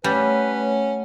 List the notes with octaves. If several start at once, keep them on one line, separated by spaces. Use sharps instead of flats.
G3 A3 C#4 B4 C#5 F#5